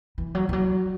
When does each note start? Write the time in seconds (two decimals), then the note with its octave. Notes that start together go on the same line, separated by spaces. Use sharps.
0.18 E3
0.35 F#3
0.49 E3
0.53 F#3